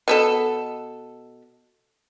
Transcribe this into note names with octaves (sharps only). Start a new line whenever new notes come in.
B2 B3 A4